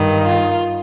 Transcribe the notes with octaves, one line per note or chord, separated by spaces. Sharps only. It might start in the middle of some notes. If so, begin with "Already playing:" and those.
Already playing: G2 D#3
F4